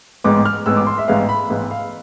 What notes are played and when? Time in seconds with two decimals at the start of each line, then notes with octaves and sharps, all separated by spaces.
0.24 A1 G#2 G#3 B3 D6
0.45 F6
0.66 A1 G#2 G#3 B3 E6
0.77 D6
0.87 C6
0.98 E5
1.08 A1 G#2 G#3 B3 F5
1.29 B5
1.49 A1 G#2 G#3 B3
1.71 F5